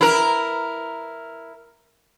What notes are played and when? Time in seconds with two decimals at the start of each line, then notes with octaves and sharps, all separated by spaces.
0.01 E4 A#4